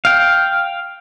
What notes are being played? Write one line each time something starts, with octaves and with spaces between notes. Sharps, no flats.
F5 G5